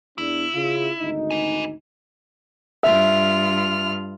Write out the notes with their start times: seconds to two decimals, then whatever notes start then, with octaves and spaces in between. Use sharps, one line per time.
0.18 E2 D4 E4
0.54 C#3 F4
1.00 G#1 D2 D#4
1.31 B4 G#5
2.83 G2 F4 E5 F6